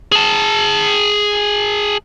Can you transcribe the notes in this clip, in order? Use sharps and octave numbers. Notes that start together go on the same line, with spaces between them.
G#4 A5